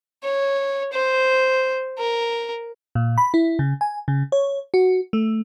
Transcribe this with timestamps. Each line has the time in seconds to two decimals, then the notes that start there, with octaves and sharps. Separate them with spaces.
0.23 C#5
0.93 C5
1.99 A#4
2.95 A#2
3.18 B5
3.34 E4
3.59 C#3
3.81 G#5
4.08 C#3
4.32 C#5
4.74 F#4
5.13 A3